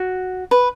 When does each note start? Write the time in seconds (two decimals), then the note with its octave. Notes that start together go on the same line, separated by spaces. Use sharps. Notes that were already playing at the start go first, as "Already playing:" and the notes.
Already playing: F#4
0.51 B4